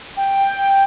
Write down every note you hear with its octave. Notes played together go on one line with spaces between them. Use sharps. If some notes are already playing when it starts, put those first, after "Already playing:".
G5